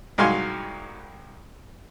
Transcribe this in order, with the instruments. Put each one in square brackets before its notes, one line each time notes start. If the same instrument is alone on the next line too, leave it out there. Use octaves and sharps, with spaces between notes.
[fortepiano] C2 G#2 F#3 F5 G#5 C6